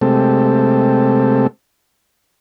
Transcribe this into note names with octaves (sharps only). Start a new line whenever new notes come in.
C3 G#3 A3 C4 G4 A4